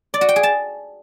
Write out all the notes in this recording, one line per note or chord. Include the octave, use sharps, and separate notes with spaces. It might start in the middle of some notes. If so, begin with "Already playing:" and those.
D5
F#4
G5
G#4
A5